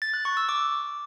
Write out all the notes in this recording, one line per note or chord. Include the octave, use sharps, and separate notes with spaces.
A6
F#6
C#6
E6
D6